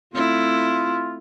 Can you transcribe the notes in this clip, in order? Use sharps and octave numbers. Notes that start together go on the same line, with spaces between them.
A3 C4 E4 F4